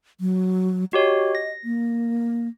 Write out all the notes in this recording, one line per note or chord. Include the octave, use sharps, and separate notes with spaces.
F#3
F#4 G4 C#5 D#5
A#6
A#3